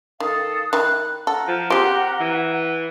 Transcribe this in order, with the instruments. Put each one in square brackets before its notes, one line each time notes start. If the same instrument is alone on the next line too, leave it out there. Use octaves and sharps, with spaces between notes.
[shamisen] D#3 [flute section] A4 F5 D#6
[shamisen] D#3 E4 [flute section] F#6
[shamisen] A4 [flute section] A#4 F#5
[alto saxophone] F3
[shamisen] C4 G#4 [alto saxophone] G4
[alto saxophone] E3